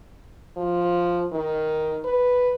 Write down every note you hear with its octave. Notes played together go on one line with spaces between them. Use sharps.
F3
D#3
B4